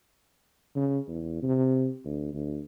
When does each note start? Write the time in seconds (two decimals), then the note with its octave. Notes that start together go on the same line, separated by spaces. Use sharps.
0.76 C#3
1.08 E2
1.43 C3
2.05 D2
2.33 D2